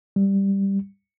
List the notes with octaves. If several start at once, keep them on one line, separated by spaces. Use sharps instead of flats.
G3